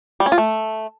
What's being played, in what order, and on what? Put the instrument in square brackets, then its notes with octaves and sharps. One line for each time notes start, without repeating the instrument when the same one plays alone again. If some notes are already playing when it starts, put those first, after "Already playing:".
[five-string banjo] G3
C#4
F4
A3